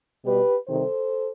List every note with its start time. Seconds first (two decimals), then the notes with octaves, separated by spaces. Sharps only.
0.25 B2 G3 G4 B4
0.68 C3 D#3 G3 A4 C5